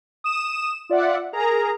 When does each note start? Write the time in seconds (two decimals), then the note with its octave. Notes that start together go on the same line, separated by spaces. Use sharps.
0.24 D#6 E7
0.90 F4 D5 E5 F#5
1.33 G#4 A#4 A#5